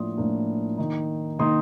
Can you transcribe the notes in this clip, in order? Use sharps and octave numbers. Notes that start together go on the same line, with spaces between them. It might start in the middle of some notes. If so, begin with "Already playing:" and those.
Already playing: A2 F3 A#3 D4 D5 C6 D#6
A2 F3 A#3 D4
D#3 A#3 D#4
D#3 A#3 D#4 C6 D#6